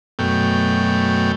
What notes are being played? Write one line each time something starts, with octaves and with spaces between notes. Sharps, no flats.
F#2 B2 A3 G5